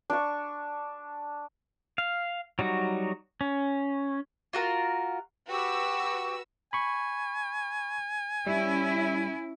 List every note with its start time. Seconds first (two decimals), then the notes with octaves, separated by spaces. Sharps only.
0.10 D4 C#6
1.98 F5
2.59 F#3 G3 D#4 F#4
3.41 C#4
4.53 F4 F#4 A#4
5.50 F#4 G4 B4 G5 C#6 E6
6.73 G#5 B5 C#6
8.46 G3 C#4 E4